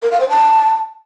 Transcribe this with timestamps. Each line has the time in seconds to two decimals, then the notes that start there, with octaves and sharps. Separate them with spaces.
0.02 A#4
0.11 F5
0.20 C5
0.29 A5